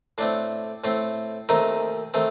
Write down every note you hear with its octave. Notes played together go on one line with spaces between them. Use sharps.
A2 A3 C4 D4
A2 A3 C4
D#2 D#3 A3 C4 D#4
D#3 A3 C4